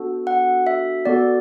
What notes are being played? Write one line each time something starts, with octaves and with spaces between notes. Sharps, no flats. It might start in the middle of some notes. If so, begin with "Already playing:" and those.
Already playing: B3 D4 F#4 A4
F#5
E5
B3 F#4 A4 D5